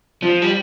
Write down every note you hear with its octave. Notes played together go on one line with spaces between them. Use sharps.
F3
G3